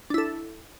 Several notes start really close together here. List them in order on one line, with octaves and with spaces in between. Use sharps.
D4 E4 A4